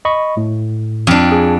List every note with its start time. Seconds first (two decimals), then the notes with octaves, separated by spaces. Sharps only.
0.05 D#5 B5 C#6
0.37 A2
1.07 F2 D4
1.32 G#4